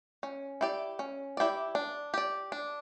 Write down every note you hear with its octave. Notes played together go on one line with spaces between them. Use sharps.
C#4
E4 G4 D5
C#4
E4 G4 D5
D4
G4 D5
D4